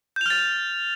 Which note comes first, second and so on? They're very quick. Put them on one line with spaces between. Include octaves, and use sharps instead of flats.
G6 F7 F6 A6